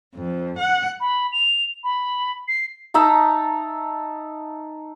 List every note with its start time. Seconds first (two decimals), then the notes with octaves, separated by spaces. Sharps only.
0.15 F2
0.58 F#5
1.00 B5
1.32 F7
1.84 B5
2.48 C7
2.94 D#4 E5 A5 A#5